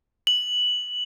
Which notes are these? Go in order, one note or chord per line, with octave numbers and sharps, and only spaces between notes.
F#7